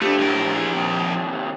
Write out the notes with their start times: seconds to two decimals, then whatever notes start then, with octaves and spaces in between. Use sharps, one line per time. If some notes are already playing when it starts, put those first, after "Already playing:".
0.01 F2 A3 D4 G4
0.19 F#2 A2 F3 A#4
0.55 E3 G#4
0.74 D#2 C3